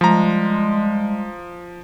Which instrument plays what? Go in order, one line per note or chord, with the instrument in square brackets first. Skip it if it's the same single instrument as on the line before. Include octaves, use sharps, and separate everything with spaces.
[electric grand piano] F3 A#5 [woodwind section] G3 G#3